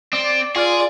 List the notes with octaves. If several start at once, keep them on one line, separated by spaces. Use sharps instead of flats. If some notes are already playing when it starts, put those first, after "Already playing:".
C4 D5
F4 G#4 D5